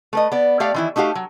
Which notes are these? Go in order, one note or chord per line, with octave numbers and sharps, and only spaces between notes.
A3 B4 D#5
B3 D5
A3 G4 D5 F5 G5
D#3 E3 E4
A3 D#4 F#4 G4 F5
F#3